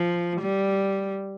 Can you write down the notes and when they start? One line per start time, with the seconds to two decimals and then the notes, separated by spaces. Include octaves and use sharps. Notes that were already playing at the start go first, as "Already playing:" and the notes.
Already playing: F3
0.41 G3